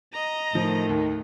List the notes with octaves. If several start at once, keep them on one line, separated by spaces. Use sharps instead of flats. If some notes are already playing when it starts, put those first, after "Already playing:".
D#5 A#5
A2 D#3 F3
D#2